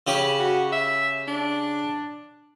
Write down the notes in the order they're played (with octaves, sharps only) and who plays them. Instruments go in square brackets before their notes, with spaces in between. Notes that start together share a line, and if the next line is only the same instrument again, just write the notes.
[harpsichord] C#3 G4 B5
[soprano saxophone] F#4
E5
D4